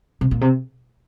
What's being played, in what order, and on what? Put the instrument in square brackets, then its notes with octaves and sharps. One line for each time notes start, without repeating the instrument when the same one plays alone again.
[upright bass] C3
A#2
C3